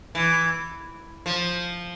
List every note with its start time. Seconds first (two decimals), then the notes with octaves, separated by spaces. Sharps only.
0.15 E3
1.26 F3